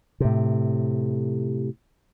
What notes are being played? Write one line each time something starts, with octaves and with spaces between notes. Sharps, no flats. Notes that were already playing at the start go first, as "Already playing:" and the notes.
A2 C3